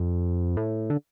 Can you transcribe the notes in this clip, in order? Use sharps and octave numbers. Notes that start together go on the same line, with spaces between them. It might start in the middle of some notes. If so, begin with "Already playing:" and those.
Already playing: F2
A2
D3